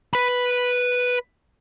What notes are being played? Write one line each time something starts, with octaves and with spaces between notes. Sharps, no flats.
B4 B5